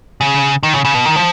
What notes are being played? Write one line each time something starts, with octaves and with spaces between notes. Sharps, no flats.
C#3
D#3
C#3
C#3
B2
D#3
F3